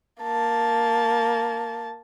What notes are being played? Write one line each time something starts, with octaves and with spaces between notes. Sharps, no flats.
A#3 A5